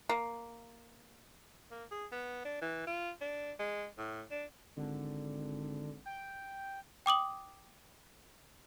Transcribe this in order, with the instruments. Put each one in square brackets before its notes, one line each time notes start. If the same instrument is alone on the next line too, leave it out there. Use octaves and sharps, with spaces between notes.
[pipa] A#3
[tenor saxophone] A#3
G#4
B3
D4
E3
F4
D4
G#3
A2
D4
[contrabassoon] G#1 [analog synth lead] D3
[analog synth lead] G5
[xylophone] G5 D6 D#6 F#7